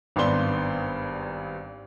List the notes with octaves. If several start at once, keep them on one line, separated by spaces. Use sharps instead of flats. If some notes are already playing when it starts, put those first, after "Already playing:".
G#1 G2 B3 D4 C6 G7